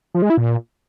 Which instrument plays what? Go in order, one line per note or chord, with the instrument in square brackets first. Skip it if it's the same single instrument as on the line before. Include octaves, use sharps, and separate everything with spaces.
[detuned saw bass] F3
G#3
E4
A#2